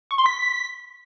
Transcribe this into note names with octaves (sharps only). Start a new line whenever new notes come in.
C#6
C6
B6